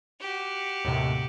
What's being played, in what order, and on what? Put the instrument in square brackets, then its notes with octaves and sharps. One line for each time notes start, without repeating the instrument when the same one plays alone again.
[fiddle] F#4 G4
[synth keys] D#2 A2 C3